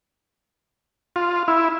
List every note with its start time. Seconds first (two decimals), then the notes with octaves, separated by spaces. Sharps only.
1.16 F4
1.48 E4